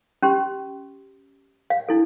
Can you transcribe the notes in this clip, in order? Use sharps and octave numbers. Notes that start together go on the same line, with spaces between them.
C#4 G4 C6
F5
D4 E4 A4